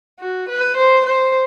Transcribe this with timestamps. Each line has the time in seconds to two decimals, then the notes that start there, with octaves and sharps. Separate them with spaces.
0.20 F#4
0.49 B4
0.77 C5
1.06 C5